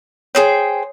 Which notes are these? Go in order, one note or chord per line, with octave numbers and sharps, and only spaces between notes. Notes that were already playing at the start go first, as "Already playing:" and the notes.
G#4 C5 C#5 G5 D#6